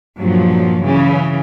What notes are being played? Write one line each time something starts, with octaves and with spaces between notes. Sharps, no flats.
G2 A#2 F3 F#3
C#3 E3